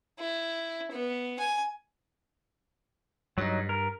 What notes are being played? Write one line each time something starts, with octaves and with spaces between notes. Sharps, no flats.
E4
B3
G#5
G2 F#3 D#4
A#4